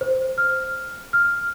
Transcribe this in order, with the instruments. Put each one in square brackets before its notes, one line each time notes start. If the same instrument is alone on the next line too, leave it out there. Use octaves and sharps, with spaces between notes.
[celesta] C5
F6
F6